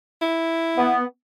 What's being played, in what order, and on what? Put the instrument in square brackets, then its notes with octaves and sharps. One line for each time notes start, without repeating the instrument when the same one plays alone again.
[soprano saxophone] E4
[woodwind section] B3